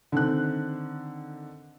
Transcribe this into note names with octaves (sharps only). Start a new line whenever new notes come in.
D3 D#3 C4 F#6